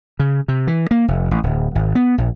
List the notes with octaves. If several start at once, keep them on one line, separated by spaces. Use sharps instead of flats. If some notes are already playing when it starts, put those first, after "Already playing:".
C#3
C3
E3
A#3
F1
A1
D1
G#1
B3
A#1